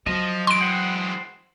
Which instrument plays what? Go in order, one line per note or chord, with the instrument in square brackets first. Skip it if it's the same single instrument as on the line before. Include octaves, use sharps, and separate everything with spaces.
[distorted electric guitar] F3 [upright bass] F#3 [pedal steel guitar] D#5
[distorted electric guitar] E3 G#3 [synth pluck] C6 D7
[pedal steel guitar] C5 F#5 G5